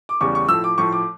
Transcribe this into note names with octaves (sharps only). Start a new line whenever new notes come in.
D6
E2 C#3 G3 C#6
C#6
A2 F3 E6
D6
A2 F3 C#6
D6